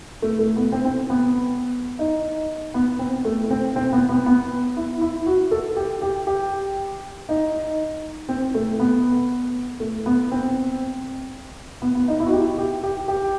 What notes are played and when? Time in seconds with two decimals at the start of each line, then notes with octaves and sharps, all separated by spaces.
0.22 A3
0.39 A3
0.56 B3
0.72 C4
0.85 C4
1.10 B3
1.99 D#4
2.74 B3
2.99 C4
3.25 A3
3.51 C4
3.76 C4
3.93 B3
4.09 B3
4.26 B3
4.77 E4
5.01 E4
5.27 F#4
5.51 A4
5.77 G4
6.02 G4
6.27 G4
7.29 D#4
8.29 C4
8.55 A3
8.80 B3
9.80 A3
10.06 B3
10.32 C4
11.82 B3
11.95 B3
12.08 D#4
12.20 E4
12.26 F#4
12.33 G4
12.58 G4
12.83 G4
13.08 G4